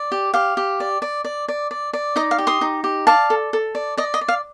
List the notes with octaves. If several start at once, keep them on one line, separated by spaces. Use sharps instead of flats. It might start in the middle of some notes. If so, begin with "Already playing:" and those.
Already playing: D5
G4
G4 F5
G4
D5
D5
D5
D5
D5
D5
D#4 D#5
F5
G4
C6 D#6
D#4
G4
D5 F5 A5
A4
A4
D5
D5 D#5
D#5
D5
F5